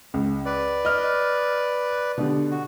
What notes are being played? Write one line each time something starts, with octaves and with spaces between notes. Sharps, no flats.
C#2
B4 D5
D#5 F6
B2 D3 G4
F#4